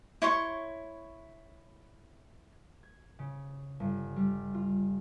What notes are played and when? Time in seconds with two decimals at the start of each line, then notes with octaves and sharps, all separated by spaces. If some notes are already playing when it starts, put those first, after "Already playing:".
0.22 E4 C#5 C6 C#6
2.83 G#6
3.19 C#3
3.80 G1
4.16 G3
4.54 F4